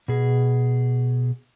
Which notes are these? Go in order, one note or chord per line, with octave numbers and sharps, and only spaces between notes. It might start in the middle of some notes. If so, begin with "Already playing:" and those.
B2 G#4